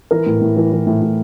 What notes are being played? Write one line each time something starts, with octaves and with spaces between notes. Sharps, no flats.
E3 A#4
A2
A2
E3
E3
A2
A2